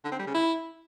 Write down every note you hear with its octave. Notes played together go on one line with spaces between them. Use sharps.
D3
C4
G3
C#3
E4